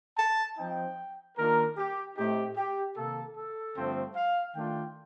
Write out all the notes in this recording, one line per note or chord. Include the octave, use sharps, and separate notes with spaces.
A5
F3 C4 D#4 G5
D#3 A#3 D4 F4 A#4
G4
A2 A3 C4 D#4 G4
G4
C3 D#3 A#3 A4
A4
G2 D3 F3 A3 C4
F5
D#3 A3 D4 F4 G5